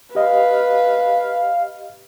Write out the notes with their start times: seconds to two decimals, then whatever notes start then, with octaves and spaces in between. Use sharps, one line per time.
0.15 G4 B4 D#5 F5